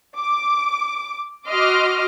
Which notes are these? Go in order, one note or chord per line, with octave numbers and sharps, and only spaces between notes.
D6
F#4 D#5 C6 D6 F6